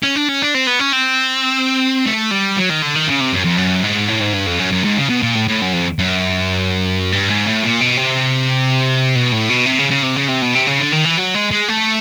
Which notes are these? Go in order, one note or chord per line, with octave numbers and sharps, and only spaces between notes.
C#4
D4
C#4
D4
C4
B3
C#4
C4
A3
G3
F#3
D#3
D3
D#3
C#3
C3
F#2
F2
F#2
G#2
A2
G#2
G2
F2
F#2
F#2
G#2
C#3
B2
A#2
A2
A2
F#2
F2
F#2
G2
G#2
A2
A#2
B2
C3
B2
A2
B2
C3
C#3
C#3
C3
C#3
C3
B2
C3
C#3
D3
D#3
E3
F#3
G#3
G#3
A3